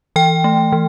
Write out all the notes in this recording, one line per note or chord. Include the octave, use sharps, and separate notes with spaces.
E3 G5
A3
E3